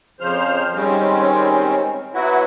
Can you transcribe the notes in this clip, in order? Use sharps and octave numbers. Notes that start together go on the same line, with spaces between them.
F2 C#3 F3 C5 F6
D#3 G3 G#3 C4 C#4
F#3 B3 E4 F#4